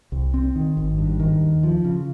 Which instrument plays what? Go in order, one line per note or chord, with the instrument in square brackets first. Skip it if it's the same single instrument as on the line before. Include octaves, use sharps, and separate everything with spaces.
[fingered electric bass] C2
C4
D#3
G#1
G2
D#3
D#2
F3
C#3